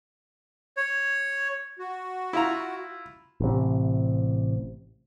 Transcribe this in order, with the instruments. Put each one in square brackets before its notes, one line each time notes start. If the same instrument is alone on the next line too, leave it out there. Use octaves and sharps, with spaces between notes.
[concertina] C#5
[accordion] F#4
[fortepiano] E4 F4 A#5
[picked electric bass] A1 C3